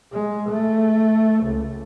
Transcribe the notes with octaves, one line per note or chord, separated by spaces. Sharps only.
G#3
A3
C#2